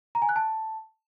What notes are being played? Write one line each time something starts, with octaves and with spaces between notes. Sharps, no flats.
A#5
G#5
F#6
A5